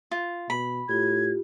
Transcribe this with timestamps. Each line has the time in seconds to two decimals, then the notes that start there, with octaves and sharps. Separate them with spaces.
0.11 F4
0.50 B2 B5
0.89 A2 F4 G4 G#6